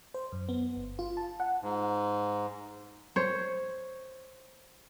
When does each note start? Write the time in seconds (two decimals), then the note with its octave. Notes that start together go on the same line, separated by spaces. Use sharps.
0.14 C5
0.32 F#2
0.49 B3
0.76 G1
0.99 F4
1.17 A5
1.40 F#5
1.61 G#2
3.16 C5 C#5